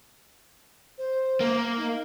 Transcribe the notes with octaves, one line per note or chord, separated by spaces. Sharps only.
C5
A#3
D#4